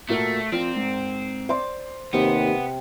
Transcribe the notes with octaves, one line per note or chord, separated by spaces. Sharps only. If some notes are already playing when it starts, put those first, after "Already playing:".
A#2 A3 F#4 A#4
F3 C4 A#4 D5
G#2
C5 D5 C6 D6
D#2 C3 B3 C4